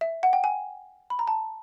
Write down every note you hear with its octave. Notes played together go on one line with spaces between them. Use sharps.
E5
F#5
G5
G#5
B5
A#5
A5